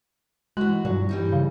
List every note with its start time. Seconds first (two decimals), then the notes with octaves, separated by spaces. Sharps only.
0.57 E3 G#3 F#4 F#6
0.85 G2 A#2 F#3
1.09 E3 G3 D#4
1.32 C#3